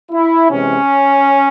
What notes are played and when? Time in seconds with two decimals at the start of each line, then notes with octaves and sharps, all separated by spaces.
0.11 E4
0.50 C3 E3 G#3 C#4